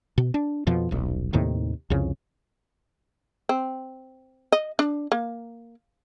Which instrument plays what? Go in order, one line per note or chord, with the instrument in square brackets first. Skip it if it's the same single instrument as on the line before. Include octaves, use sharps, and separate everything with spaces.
[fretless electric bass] B2
D4
F2 B2 F3
D#1 B1
D#2 A2 C3 D#3
C2 F2 C#3
[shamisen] C4
D#5
D4
A#3